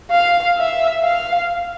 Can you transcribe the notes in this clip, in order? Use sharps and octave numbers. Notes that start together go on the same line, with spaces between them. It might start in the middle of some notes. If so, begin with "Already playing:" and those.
F5
E5
F5